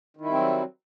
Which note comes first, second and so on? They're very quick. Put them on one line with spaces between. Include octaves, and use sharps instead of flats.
D#3 E4 G3 C4 F#3